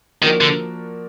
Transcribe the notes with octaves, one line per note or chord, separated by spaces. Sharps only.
D#3 F3 A#3 D4 F#4 A#4
D3